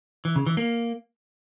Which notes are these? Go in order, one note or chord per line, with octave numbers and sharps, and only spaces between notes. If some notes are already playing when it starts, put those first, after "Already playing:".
E3
C#3
E3
A#3